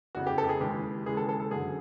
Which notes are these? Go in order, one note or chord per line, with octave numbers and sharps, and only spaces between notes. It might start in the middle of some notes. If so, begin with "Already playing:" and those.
F1 E2 C#3 F#4
G4
A4
G4
G#4
D#2 C#3 E3 G#3 G4
D#2 C#3 E3 G#3 G#4
A4
A4
A4
F#2 D3 F#3 G#4